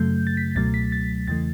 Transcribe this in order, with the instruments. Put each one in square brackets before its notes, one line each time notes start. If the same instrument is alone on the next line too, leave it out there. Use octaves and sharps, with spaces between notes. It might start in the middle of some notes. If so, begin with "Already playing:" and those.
Already playing: [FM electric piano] F#2 C#3 F#3 A3 G6
A6
B6
C#2 B2 F#3 A3 A6
B6
A6
E2 C#3 E3 A3 A6